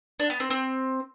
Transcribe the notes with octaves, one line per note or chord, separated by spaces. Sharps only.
D4
B3
C4
C4